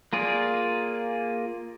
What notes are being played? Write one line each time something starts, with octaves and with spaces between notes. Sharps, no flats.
A#3 F4 G#4 D5